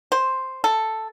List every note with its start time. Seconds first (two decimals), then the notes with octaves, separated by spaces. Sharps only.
0.12 C5
0.64 A4